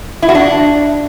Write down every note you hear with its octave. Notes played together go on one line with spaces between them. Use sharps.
E4
F#4
D4